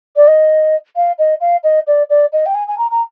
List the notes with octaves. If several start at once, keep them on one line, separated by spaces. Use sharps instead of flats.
D5
D#5
F5
D#5
F5
D#5
D5
D5
D#5
G5
G#5
G#5
A#5
A#5